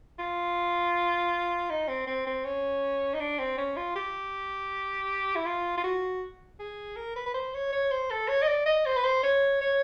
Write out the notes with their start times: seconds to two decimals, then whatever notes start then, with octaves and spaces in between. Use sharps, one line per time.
0.19 F4
1.70 D#4
1.88 C4
2.07 C4
2.26 C4
2.45 C#4
3.14 D#4
3.20 D4
3.39 C4
3.58 C#4
3.76 F4
3.96 G4
5.36 E4
5.46 F4
5.77 F4
5.84 F#4
6.59 G#4
6.96 A#4
7.16 B4
7.26 B4
7.34 C5
7.54 C#5
7.72 C#5
7.91 C5
8.10 A4
8.28 C#5
8.42 D#5
8.47 D5
8.66 D#5
8.85 C5
8.96 B4
9.04 C5
9.23 C#5
9.61 C#5